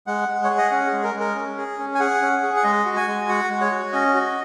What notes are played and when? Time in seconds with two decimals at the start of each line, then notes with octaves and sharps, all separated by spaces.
0.07 G#3 F#5
0.29 G#3
0.44 C#5
0.50 G#4
0.58 D#5
0.71 C#4 F#5
0.87 G#4
0.93 G#3
1.03 A#4
1.14 G#3
1.20 A#4
1.36 C#4
1.57 G#4
1.79 C#4
1.95 G#5
2.00 G#4 F#5
2.22 C#4
2.43 G#4
2.56 F#5
2.64 G#3 D#5
2.85 F#4
2.96 G#5
3.08 G#3
3.28 F#4 F#5
3.50 G#3
3.61 C#5
3.71 F#4
3.93 C#4 D#5
4.14 F#4